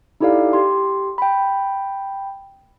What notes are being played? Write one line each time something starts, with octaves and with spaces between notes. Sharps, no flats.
D#4 E4 G4 A4 D5 F5
G4 C6
G5 B5